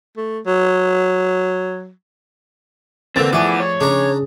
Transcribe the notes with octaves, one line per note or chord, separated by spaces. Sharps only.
A3
F#3
D3 E3 A#3 C4 A6 F7
E3 F3 A3 B3 G#4 D5
C#5
C#3 D4 A#5